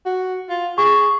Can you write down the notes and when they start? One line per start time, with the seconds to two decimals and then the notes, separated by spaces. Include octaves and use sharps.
0.06 F#4
0.50 F4
0.78 G#4 C#6